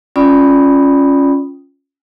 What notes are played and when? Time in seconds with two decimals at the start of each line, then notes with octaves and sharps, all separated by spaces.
0.16 C#4 F4 D5 G5 B5 D#6